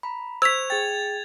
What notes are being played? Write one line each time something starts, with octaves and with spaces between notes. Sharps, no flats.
A#5 B5
C5 C#6 E6 G#6 B6 F7
G#4 G5 A6